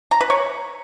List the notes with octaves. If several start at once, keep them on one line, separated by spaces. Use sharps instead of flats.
A#5
B4
C#5